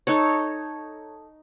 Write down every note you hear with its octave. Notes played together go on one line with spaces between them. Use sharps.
D#4 A4 C#5